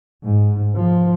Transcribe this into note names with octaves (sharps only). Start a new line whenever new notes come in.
G#2
F3